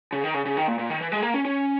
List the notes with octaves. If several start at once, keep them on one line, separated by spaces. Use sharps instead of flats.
C#3
D#3
C#3
C#3
D#3
A#2
A#2
D#3
E3
G#3
A#3
C#4
C#4